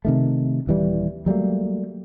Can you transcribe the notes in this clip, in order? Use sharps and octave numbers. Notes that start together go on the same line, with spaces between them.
C3 D#3 A3
D#1 E3 G3
F#3 G3 A3 A#3